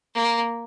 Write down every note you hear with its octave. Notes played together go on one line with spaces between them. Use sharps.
A#3